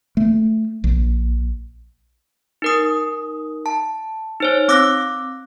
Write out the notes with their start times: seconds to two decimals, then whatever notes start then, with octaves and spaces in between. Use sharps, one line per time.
0.17 A3
0.84 A#1
2.62 D#4 A#4 D#6
3.66 A5
4.40 D#4 C5 C#5
4.68 C4 D6 E6 F#6 A#6